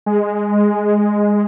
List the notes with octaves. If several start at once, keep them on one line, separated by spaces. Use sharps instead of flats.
G#3